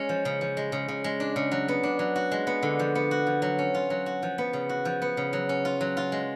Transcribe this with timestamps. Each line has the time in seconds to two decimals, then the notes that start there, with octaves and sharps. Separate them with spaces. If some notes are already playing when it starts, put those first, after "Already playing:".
Already playing: G#3 C#4
0.09 F3
0.25 C#3
0.41 F3
0.57 G#3
0.72 C#3
0.88 C#3
1.04 G#3
1.20 D4
1.36 C#3
1.52 F#3
1.68 B3
1.83 D4
1.99 F#3
2.16 F#4
2.31 G#3
2.47 B3
2.63 D3
2.79 F3
2.95 B3
3.11 F#4
3.27 F3
3.42 F#3
3.59 C#4
3.74 F4
3.90 F#3
4.06 F#4
4.23 F3
4.38 B3
4.53 C#3
4.69 F#4
4.85 F3
5.02 B3
5.17 C#3
5.33 F#3
5.49 C#4
5.65 F4
5.81 F#3
5.97 F4
6.12 G#3